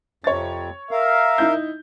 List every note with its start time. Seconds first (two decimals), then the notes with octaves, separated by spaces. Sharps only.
0.24 F2 C3 C#5 A6
0.91 A#4 E5 F5
1.38 D#4 E4 G6